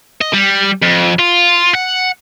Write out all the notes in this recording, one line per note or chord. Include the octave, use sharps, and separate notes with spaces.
D#5
G3
F2
F4
F#5